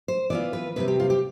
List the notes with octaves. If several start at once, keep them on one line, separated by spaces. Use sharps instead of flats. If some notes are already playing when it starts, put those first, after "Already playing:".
C5
E3 B3 F4 D5
B4
E2 C3 G3 C4 B4
G4
F4
G4